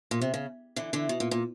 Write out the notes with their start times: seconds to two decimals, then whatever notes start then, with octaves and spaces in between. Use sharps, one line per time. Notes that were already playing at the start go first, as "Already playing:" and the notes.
0.11 A#2
0.21 C3
0.34 C#3
0.76 D3 E3
0.93 D3 E3
1.09 B2
1.20 A#2
1.31 A#2